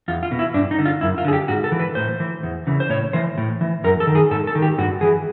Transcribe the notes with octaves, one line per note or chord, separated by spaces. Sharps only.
E2 F4
F4
B2
E4
G2 D4
D#4
D3
F4
F#2 E4
F4
D3 G#4
G4
G#2 F#4
A4
E3
B4
A2 C5
E3
E2
C#3 E3
C5
A2 C#5
E3 C5
A2
E3
F#2 A#4
A4
D#3
G#4
G#2 A4
A4
D#3
G4
G2 F#4
E3 G#4